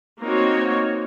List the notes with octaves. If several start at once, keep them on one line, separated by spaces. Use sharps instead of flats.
A#3 C4 D#4 F#4 C#5